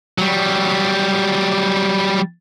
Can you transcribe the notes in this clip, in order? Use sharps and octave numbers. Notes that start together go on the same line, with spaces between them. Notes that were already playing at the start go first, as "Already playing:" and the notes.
F#3 G3